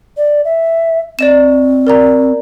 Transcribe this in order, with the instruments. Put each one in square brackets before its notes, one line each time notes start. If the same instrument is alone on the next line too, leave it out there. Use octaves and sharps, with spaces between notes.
[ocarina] D5
E5
[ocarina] C4 [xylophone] D5 D#5 E7
[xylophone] A#4 D5 A#5